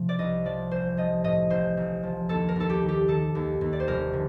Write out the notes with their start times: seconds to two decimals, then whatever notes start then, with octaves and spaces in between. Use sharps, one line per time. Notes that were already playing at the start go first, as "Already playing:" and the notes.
Already playing: C3 F3
0.09 D5
0.19 C2 D#5
0.45 F3 D5
0.71 A1 C5
0.97 F3 D#5
1.24 A2 D#5
1.50 A1 C5
1.77 A1
2.03 F3
2.29 D#2 A4
2.49 A#4
2.56 D#2 A4
2.69 G4
2.83 D#3
2.88 G4
3.08 D#3 A4
3.35 D#2
3.61 D#2
3.73 D5
3.80 C5
3.87 F1 A#4
4.13 D3